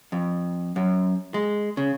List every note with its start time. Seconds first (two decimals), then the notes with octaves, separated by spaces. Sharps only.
0.12 F2
0.76 F#2
1.34 G#3
1.77 C#3